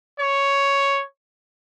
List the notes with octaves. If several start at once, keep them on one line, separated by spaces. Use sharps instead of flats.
C#5